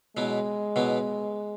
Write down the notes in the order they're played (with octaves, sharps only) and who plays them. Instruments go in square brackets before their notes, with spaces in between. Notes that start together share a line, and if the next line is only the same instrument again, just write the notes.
[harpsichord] B2 F#3 B3 E4 [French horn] G#3
[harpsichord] B2 F#3 B3 E4